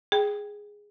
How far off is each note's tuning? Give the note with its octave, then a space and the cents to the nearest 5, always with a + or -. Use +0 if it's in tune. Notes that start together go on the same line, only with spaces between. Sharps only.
G#4 -5 G5 +0